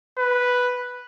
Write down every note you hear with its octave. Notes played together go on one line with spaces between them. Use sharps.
B4